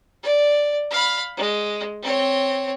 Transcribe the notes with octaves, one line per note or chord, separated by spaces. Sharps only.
D5
F5 B5
G#3
C4 C#5